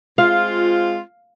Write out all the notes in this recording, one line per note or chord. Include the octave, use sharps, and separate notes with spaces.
G#3 C4 F4 F5